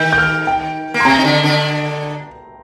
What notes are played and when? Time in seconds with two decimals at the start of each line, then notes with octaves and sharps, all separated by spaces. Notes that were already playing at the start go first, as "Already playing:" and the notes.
Already playing: D#3 G6
0.13 G6
0.18 F6
0.47 G5
0.94 A#3
1.00 C6
1.05 C3 C4 A#5
1.19 D#4
1.24 D3 D4
1.43 D3 D4